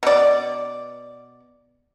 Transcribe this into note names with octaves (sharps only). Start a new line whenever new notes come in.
B2 D5